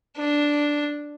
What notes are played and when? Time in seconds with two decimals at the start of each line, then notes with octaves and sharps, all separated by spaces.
0.17 D4